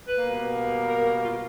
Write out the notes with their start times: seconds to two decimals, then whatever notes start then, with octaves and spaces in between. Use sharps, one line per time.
0.08 B4
0.17 B2 G3 A#3
0.89 A#4
1.24 F4